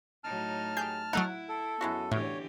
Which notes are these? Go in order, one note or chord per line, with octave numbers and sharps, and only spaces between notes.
A2 F#3 D#4 A5 F6
G4 G#4 G6
F#3 A3 D#4 E4 F#5
A4
F#2 G#3 B3 E4 F#4
A2 D3 E3 G4 C#5